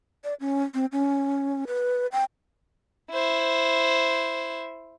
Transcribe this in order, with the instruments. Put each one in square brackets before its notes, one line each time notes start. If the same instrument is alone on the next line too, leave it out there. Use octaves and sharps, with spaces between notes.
[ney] D5
C#4
C4
C#4
B4
G5
[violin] E4 C5